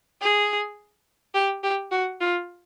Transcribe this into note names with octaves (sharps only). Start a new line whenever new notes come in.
G#4
G4
G4
F#4
F4